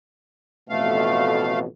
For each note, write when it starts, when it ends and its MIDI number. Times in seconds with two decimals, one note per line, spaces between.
0.69 1.65 33
0.69 1.65 41
0.69 1.65 47
0.69 1.59 57
0.69 1.59 77